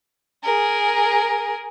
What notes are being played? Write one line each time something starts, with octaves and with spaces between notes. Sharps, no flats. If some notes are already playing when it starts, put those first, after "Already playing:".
G#4 A#4